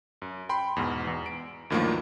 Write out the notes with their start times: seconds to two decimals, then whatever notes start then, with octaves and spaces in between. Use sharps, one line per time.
0.22 F#2
0.49 G5 B5 C6
0.76 E2 G#2 B2
1.07 E2
1.26 D7
1.70 D2 G2 D#3 F3 F#3 A#3